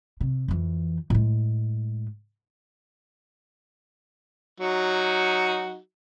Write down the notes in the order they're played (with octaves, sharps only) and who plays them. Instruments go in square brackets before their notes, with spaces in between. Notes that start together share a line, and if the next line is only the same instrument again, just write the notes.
[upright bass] C3
F2 E3
A2 G#3
[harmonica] F#3 D#4 F#4